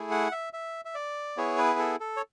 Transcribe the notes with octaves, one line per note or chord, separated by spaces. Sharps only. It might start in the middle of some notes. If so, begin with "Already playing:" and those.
Already playing: A3 E4 G#4
F#5
E5
E5
E5
D5
B3 E4 G#4 C#5
B4
A4
A4
C#5